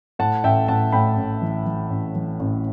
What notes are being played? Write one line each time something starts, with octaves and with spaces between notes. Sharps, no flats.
A2 F#5 A5
A1 E5 G5
A1 F#5 A5
A2 G5 B5
A1
E3
E3
A1
E3
A1